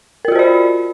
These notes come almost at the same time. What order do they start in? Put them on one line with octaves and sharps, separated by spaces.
A#4 F4 F#4 C5 D5